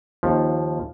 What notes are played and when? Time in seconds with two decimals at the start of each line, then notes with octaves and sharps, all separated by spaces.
0.23 D#2 F3